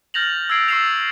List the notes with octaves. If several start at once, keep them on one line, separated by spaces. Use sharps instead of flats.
F6 G6 A6 A#6 F7 F#7
E6 G6 G#6 C7 D7 F#7
C#6 E6 A6 C7 E7 F7